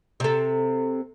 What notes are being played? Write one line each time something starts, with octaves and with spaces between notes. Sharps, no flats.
C3 A4